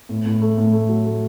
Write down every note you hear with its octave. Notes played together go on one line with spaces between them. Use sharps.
A2
A2
A3
A2
A3
F#3
A3